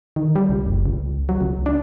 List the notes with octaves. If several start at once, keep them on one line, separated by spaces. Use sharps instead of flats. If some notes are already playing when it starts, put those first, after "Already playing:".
D#3
G3
C#2
F#1
C#2
F#3
C#2
D4